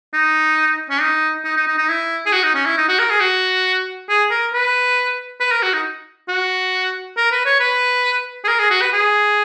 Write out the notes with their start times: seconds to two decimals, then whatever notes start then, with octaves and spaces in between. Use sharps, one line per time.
0.13 D#4
0.90 C#4
1.01 D#4
1.45 D#4
1.57 D#4
1.67 D#4
1.78 D#4
1.89 E4
2.26 G#4
2.32 F#4
2.44 D#4
2.55 C#4
2.66 E4
2.77 D#4
2.89 F#4
2.99 A#4
3.10 G#4
3.20 F#4
4.09 G#4
4.31 A#4
4.53 B4
5.40 B4
5.51 A#4
5.63 F#4
5.73 D#4
6.28 F#4
7.17 A#4
7.32 B4
7.45 C#5
7.60 B4
8.44 G#4
8.48 A#4
8.59 G#4
8.71 F#4
8.82 B4
8.93 G#4